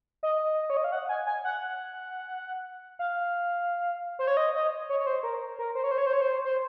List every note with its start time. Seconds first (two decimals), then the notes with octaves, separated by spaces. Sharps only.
0.23 D#5
0.70 C#5
0.77 D#5
0.84 F5
0.92 F#5
1.09 G#5
1.27 G#5
1.44 F#5
2.99 F5
4.19 C5
4.27 C#5
4.37 D#5
4.55 D#5
4.89 C#5
5.00 C#5
5.07 C5
5.23 A#4
5.59 A#4
5.75 C5
5.84 C#5
5.91 C5
5.98 C#5
6.06 C5
6.13 C#5
6.21 C5
6.45 C5